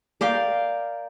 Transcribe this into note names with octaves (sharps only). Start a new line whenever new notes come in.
A#4 D5 F5 G5